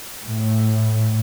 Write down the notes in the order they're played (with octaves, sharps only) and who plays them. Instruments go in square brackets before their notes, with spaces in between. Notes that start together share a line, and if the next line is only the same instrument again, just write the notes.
[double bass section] A2